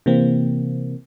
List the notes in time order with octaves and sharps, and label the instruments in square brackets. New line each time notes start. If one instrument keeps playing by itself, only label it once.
[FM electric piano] C3 E3 A#3 C4